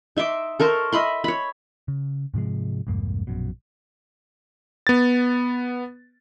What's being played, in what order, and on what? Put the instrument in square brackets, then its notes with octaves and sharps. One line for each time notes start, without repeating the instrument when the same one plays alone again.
[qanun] D#4 E5 C6 D6
A4 A#4 C5 C#6
D#5 E5 B5 C6
C#5 B5
[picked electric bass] C#3
G#2 C3 F3 G#3
C2 F2 G#2 A#3
A#1 F#2 B2
[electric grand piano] B3 A6